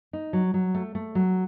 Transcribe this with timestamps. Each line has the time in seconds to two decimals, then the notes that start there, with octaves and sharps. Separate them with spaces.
0.13 D#4
0.33 F#3
0.54 F#3
0.75 A3
0.95 A3
1.15 F#3